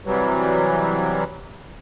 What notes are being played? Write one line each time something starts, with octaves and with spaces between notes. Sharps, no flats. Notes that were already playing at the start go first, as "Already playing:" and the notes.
C3 E3 F#3 G3